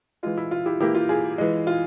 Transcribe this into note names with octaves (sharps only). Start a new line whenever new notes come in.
E3 G#3 F4
E4
F4
E4 G4
E3 A#3 E4 G4
F4
F4 G#4
E3 G#3
F4